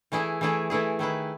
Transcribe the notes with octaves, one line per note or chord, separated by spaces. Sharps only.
E3 A3 E4 G#4
E3 A3 E4 G#4
E3 A3 E4 G#4
D#3 A3 E4 G#4 B4